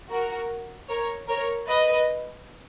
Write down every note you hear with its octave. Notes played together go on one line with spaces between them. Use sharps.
F#4 A#4
A#4 C#5
A#4 C#5
B4 D#5